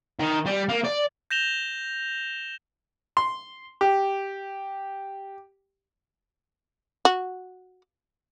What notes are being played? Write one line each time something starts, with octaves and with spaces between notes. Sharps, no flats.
D#3
G3
A#3
D5
G6 A#6 E7 F7 G7
C6
G4
F#4